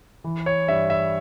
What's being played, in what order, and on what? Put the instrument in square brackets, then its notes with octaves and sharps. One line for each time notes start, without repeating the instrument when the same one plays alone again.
[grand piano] E3
C#5
G2 E5
E5